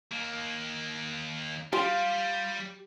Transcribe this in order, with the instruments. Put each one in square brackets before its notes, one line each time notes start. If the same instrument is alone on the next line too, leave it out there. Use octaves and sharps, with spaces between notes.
[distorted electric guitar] D#2 A#3
[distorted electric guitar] G3 [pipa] F4 [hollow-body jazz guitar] G4